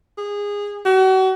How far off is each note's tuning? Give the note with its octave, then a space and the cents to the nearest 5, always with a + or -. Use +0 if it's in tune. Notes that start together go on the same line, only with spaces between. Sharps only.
G#4 -20
F#4 +35